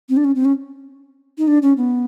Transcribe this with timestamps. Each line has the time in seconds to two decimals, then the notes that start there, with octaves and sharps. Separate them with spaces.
0.09 C4
0.16 D4
0.24 C#4
0.35 C4
0.45 C#4
1.38 D#4
1.47 D4
1.62 C#4
1.77 B3